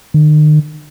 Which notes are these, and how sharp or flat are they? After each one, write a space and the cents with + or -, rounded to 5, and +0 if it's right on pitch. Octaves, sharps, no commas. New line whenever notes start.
D#3 -40